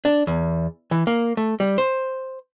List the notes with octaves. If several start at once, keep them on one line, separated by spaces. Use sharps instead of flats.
D4
E2
E3
A#3
A3
G3
C5